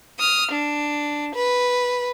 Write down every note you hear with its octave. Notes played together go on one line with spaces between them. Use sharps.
D#6 F6
D4
B4